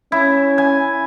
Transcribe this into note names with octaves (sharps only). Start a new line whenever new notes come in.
C#4 E4
G#5